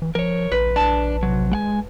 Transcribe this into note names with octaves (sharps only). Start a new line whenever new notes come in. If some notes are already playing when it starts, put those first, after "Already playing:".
E3
F3 A#4 C#5
A#1 B4
D4 A5
C3 F#3
G#3 F#5 G#5